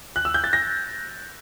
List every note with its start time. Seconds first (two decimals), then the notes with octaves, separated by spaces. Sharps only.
0.16 F#6
0.25 E6
0.34 G6
0.44 A6
0.53 A#6